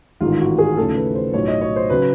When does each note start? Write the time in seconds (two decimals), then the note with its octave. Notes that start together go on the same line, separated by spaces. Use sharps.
0.21 A1 G#2 D#3 G#3 F4
0.39 F#4
0.59 G#4
0.77 D#2 C#3 F3 A3 A4
0.96 B4
1.15 C5
1.33 B1 A2 F3 C#5
1.48 D#5
1.61 C#5
1.76 C5
1.90 C#3 F#3 B4